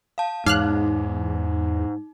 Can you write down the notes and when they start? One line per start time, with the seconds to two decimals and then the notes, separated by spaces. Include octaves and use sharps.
0.18 F5 A5
0.46 E2 G#2 D#4 F5 F6 F#6